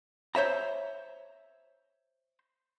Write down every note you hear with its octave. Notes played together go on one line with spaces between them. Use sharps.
C5 C#5 E5 A#5